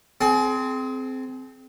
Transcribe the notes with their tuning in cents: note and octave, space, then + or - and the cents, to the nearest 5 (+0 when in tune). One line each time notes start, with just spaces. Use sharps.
C4 -10 G#4 +35